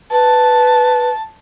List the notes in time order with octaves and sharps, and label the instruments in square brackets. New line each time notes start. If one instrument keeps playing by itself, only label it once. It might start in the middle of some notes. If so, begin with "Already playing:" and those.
[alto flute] B4 [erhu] A5